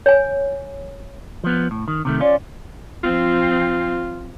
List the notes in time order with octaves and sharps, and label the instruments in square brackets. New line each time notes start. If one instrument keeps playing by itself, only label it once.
[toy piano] C#5 G#5
[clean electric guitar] F3 B3
A2
D#3
C3 D#3 A3
[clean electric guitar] C#4 F4 [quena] D5
[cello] F3 C4 [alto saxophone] F4